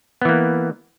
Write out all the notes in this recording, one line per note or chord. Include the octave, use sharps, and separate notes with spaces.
E3 A#3 B3